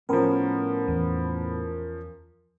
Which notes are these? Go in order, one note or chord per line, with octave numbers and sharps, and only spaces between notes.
A2 F3 B3 C#4 A#4
E2